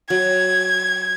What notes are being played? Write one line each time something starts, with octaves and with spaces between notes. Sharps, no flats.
F#3 G#6